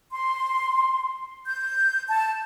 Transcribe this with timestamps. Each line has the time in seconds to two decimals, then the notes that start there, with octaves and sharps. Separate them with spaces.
0.12 C6
1.46 G6
2.09 A5